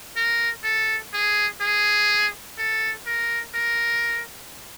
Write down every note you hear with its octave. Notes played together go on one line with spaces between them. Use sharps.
A#4
A4
G#4
G#4
A4
A#4
A#4